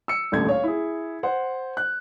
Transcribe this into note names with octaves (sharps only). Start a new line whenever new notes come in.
E6 C#7
D#1 A1 D2 A3 G#6
C#5 F5
E4 G#4
C5 F#5
F#6